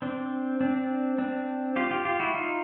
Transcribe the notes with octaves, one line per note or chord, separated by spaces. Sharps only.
C4 D4
C4 D4
C4 D4
F4 G4
F4 G4
F4 G4
E4 F#4
D#4 F4